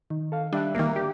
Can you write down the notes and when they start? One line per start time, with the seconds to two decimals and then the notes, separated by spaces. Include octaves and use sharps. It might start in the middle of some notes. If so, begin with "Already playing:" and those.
0.10 D#3
0.32 A4 F5
0.53 G3 D4 E5 F#6
0.75 G#1 D#3 A#3
0.96 D3 G4